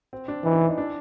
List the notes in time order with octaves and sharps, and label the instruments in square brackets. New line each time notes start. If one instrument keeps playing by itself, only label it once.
[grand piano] C4
D4
[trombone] E3 [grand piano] D#4
[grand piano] D4
E4
D#4
D4